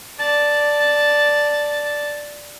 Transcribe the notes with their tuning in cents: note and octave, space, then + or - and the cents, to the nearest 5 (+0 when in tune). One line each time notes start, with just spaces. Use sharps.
D5 +0 A5 +0